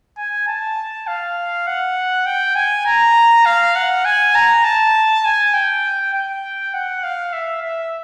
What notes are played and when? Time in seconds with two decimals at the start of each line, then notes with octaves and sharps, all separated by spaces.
0.18 G#5
0.48 A5
1.07 F5
1.67 F#5
2.26 G5
2.56 G#5
2.86 A#5
3.46 F5
3.76 F#5
4.05 G#5
4.35 A#5
4.65 A5
5.25 G#5
5.54 G5
6.14 G5
6.74 F#5
7.04 F5
7.33 E5
7.63 E5